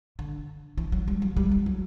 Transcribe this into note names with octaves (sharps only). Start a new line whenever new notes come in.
D3
E3
F#3
G3
F#3
G3
G3
F#3